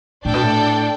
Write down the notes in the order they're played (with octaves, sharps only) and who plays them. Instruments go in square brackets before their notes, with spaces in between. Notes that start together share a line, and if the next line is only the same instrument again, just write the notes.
[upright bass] A2 [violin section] D4 A4 D5 G5
[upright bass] B2
A2